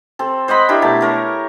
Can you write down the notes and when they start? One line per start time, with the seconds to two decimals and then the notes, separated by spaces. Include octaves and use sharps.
0.19 C4 A4
0.48 C5 D#5 F#5 B5
0.69 D4 E4 G4 A#4
0.82 B2 A3 A5 A#5
1.01 A4 A#4 C#5